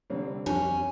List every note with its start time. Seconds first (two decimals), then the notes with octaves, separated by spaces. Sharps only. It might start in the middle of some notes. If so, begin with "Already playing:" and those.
0.10 C2 D3 C4
0.46 F2 G3 C#4 D4